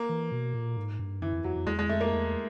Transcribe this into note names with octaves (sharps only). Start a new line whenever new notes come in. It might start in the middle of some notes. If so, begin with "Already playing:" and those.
Already playing: A#3
E3
B2
A#2
G#2
G2
F#2 E3
F2
F2 F#3
F2
E2 G#3
G#3
F2 A3
A#3
E2